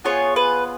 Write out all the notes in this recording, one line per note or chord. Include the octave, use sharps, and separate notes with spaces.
B3 F4 G#4 C#5
B4